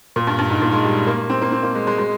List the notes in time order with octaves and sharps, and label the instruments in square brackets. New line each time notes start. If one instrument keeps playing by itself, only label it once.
[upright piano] A#2
G2
G2
G#2
A#2
G#3
G3
A#3
C4
A#3
C4
A#3
G#3
G#3
G#3